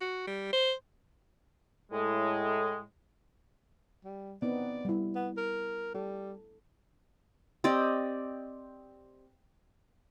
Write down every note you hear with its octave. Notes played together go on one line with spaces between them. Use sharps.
F#4
G3
C5
A2 G#3
G3
B3 C4 D#4 D5
G3 E4
B3
A#4
G3 A4
C4 G4 D5 D#5